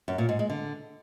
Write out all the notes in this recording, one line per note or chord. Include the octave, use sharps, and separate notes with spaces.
F#2
A#2
G#2
G#3
D3